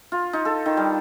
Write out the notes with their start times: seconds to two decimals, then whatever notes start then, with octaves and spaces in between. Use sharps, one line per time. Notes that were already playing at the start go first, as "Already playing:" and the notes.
0.12 F4
0.33 D#4
0.45 A4
0.66 D#3
0.77 G3